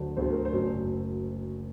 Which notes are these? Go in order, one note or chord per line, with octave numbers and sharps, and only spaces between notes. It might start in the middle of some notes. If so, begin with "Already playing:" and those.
Already playing: D2 D3 F#3 A3
D2 D3 F#3 A3 C5
A#4
C5
F#1 F#2 F#3 A3